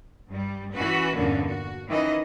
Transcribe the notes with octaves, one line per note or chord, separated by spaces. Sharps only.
G2 G3
E3 C#4 F#4 B4
E2 G2 A#2 D3 A#3 C#4
F#4
D#3 E3 C#4 D#5